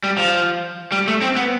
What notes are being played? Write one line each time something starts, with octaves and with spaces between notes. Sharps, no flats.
G3
F3
G3
A3
C4
B3